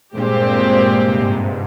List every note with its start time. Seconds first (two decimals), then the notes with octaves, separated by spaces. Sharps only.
0.16 G2 A#2 G#3 C4 G4 C5
0.85 G2
1.08 C3
1.20 G#2
1.31 G2